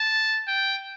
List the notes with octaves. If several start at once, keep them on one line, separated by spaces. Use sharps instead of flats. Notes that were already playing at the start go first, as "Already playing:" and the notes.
Already playing: A5
G5